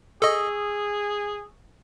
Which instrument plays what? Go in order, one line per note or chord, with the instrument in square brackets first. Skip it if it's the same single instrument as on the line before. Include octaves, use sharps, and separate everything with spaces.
[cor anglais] G#4 [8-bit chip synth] A4 D#5 [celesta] C#6 D#6 E6